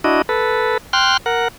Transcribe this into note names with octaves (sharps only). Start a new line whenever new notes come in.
D4 E4 F#4 D#5
A4 B4
G5 C6 F6 F#6
A#4 F#5